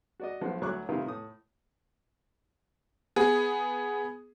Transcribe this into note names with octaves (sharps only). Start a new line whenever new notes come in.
F#4 D5 D#5
B1 F3 F#5
D2 F#3 E4 C#6 D6 F#6
C3 D#3 E4 F4
A2 D#6
B3 G#4